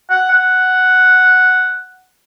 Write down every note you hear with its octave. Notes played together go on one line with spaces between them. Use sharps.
F#5
F#5